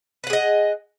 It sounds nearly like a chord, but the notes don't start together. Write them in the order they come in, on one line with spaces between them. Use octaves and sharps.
B4 F#5 G#4 D#5